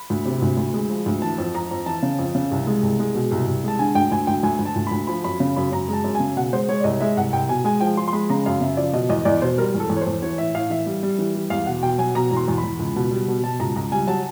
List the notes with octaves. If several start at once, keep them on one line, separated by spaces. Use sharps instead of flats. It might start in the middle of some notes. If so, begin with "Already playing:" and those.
Already playing: B5
D2
C3
D2
D2
G#3
F3
D2
E3 A5
F2
F2 A#5
F2
E3 A5
C#3
F2
C#3
C2
G#3
C2
G#3
B2
C2
C2
G#3 A5
D3 G#5
D2 G5
D2 G#5
D2 G5
D2 G#5
D2
A5
D2
D2 B5
F3 B5
F#2 B5
C#3
F#2 B5
F#2 A#5
G#3
A5
F#2
C#3 G#5
B2 F#5
G#3 C5
G#3 C#5
D5
C2 D#5
G#3 E5
C2 F#5
C2 G5
B2 G#5
G#3 G#5
F3 G5
F3 C6
C6
G#3 B5
C#3 A#5
F#2 F5
C#3 E5
F3 D5
B2 D#5
E2 D#5
E2 D5
B2 C5
G3 A#4
E2
A4
E2
C#5
E2 C5
E3 C#5
A2 E5
A2 F5
E3 E5
G3
G3
E3
G3
E2 F5
B2 F#5
B2 G5
F#3 G#5
B2 A#5
E2
C6
E2
B5
E2
C#2
B2
G3
B2
B2 A5
C#2 A#5
C#2 A#5
G3 G#5
F#3 A5